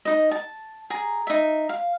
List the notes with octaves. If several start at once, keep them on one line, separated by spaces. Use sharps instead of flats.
D#4 D#5
A5
G#4 A#5
D#4 E5
F5